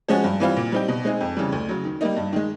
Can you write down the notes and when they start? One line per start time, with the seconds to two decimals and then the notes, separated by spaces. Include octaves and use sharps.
0.08 F3 G#3 C#4 F#4
0.24 G2
0.40 E3 G3 C4 F4
0.57 A#2
0.72 G3 C4 D#4 G4
0.88 B2
1.05 G#3 C4 D#4 G#4
1.21 F2
1.37 C#3 E3 G3
1.52 D2
1.69 C#3 F#3
1.84 D#3
2.01 G3 A#3 D#4
2.17 G2
2.33 D#3 G#3